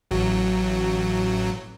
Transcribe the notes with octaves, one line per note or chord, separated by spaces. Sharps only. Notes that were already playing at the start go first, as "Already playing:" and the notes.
A1 F#3